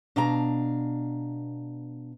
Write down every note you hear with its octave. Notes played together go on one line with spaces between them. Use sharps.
B2 D4 F5 A#5